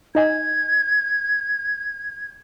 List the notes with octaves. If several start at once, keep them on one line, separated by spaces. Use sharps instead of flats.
D#4 D#5 G#5 G#6